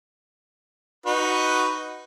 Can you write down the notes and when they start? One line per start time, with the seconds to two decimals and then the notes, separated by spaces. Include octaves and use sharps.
1.06 D#4 F#4 B4